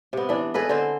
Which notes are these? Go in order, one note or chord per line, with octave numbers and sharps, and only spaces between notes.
C3 B3
E3 D4
G#4 A4 B4 D#5
D3 C4 C5